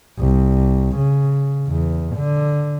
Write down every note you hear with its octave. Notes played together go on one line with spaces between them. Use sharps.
C2
C#3
E2
D3